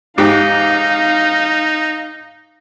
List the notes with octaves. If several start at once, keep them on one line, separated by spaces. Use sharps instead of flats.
G#2 D#4 G4 F5